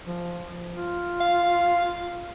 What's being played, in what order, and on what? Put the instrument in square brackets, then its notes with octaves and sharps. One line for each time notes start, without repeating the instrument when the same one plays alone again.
[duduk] F3
F4
[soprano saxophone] F5